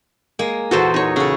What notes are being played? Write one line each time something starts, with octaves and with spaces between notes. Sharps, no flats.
G#3 A#3 G#5
E2 A#2 B3 F#4 A4 C5
D#4 C#5
C#3 F#4 A4